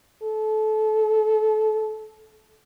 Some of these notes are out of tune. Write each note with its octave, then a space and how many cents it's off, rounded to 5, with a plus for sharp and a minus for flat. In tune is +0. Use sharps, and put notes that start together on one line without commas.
A4 -25